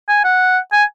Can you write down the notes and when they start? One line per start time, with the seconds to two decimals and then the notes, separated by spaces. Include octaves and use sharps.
0.08 G#5
0.24 F#5
0.72 G#5